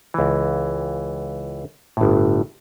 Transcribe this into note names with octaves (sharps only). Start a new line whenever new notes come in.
C#2 E3
G1 A2